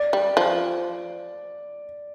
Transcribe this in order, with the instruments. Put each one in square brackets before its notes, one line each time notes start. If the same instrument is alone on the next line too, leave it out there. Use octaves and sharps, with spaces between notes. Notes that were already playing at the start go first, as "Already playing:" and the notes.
Already playing: [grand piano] D5
[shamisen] G3
F3